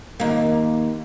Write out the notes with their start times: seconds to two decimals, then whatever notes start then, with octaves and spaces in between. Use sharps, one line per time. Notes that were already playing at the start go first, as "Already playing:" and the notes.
0.20 D#2 A#3